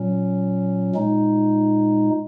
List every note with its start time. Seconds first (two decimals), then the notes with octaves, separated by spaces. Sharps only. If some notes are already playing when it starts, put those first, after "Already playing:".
Already playing: A#2 F#3 C#4
0.95 A#2 G#3 D#4